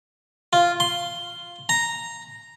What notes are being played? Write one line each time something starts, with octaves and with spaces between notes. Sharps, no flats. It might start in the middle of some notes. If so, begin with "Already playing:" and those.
F4
C6
A#5